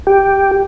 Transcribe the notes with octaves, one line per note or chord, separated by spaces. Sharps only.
G4